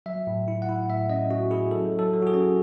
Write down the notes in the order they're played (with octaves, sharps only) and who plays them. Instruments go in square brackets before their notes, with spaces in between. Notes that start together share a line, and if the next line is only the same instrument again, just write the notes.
[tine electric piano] F#3 E5
A2
E4
F#5
E4
A2 E5
C#4 D#5
C#4 F#4
E4 G#4
F#3 A4
F#3
A4
F#3
F#4
G#4
C#4